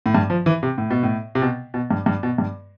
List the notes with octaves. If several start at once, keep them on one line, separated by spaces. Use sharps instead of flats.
A2
G2
F3
E3
C3
A2
B2
A2
C3
B2
B2
G2
G2
B2
G2